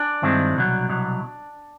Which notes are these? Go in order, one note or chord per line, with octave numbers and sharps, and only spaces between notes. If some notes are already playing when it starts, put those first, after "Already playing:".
Already playing: D4 D5
G2 D#3 G#3 C4 E4
C2 B2 F#3
C2 B2 F#3